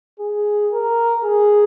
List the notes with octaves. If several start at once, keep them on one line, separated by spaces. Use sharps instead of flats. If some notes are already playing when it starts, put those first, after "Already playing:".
G#4
A#4
G#4